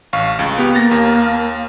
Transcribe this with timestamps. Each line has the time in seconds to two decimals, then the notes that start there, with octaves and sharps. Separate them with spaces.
0.13 A1 F5 C#6
0.39 C#2
0.58 B3 G4
0.75 A#3 A6 A#6
0.91 D#2